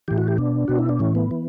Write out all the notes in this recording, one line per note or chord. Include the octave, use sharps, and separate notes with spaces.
A2 E3 G4
F#4
G4
B2 D4
B2 F#4
E4
D4
A2 E3 C#4
B3
E3